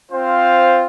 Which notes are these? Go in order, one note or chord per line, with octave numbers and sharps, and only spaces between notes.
C4 F4 C5 F5